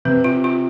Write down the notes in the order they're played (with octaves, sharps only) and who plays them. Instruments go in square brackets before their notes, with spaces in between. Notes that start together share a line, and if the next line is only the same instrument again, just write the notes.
[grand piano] C3 [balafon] B4
[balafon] F4
F4